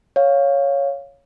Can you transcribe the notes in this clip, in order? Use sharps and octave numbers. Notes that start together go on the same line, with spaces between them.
C#5 F5